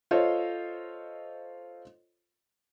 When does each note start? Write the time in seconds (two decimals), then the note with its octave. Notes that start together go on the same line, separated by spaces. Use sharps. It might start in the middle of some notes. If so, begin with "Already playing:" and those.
0.11 F4 A4 C5 C#5 D#5